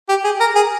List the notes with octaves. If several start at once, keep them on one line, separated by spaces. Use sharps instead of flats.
G4
G#4
A#4
G#4